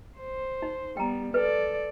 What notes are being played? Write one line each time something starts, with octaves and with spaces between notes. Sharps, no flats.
C5
D#4
G3 B3 G5 A#5
A4 B4 D5